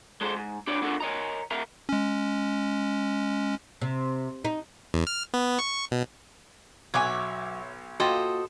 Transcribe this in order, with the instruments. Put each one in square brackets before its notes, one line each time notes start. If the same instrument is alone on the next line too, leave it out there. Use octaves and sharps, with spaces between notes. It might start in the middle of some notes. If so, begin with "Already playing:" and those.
[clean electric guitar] G#3 A4 C5
G#2
D4 G4 B4 C#5 D5
B3 D4 F4 F#4 A4 A#4
A#4 C#5 D#5 A#5
A#4 E5 F5 A#5
[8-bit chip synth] G#3 C#4
[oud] C3
D#4
[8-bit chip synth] E2
F6
B3
C#6
B2
[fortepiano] B1 D6 [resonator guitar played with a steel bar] F#3 G#5 [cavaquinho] C#5 E5
[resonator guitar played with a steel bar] A#3 F4 G5 [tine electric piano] F#4 [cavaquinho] A4 C5 D#5